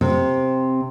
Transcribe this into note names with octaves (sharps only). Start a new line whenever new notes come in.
C3